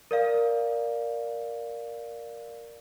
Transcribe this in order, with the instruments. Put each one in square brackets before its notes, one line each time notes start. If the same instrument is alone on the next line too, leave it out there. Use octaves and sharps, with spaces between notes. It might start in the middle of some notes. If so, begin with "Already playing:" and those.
[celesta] A#4 D5 F5